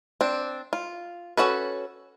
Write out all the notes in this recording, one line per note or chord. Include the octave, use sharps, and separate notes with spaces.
C4 D4
F4
C#4 F#4 A4 B4